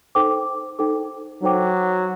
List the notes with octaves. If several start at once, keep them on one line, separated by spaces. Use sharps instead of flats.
D#4 A4 C5 G5 D6
D#4 A4 C5 G5 D6
F#3 D#4 A4 C5 G5 D6